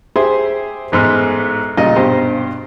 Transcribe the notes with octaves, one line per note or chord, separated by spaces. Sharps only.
G4 G#4 C5 E5 C6
A1 G#2 B3 C6 F6
A#2 C#3 G3 F4 D#5
G2 B2 G4 C5